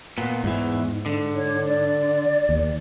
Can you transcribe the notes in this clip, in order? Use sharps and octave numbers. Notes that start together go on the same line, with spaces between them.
A#2 B3
E2 G#2 E3
D3
C#5
D5
D#2